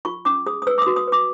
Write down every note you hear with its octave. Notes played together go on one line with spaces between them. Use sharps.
F4 C#6
C#4 D6
G#4 D#6
D#6
B4 E6
D6
F#4 D#6
D#6
B4 D6